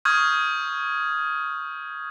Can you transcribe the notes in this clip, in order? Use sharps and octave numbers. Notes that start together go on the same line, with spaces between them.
C#6 D#6 F6 G6 G#6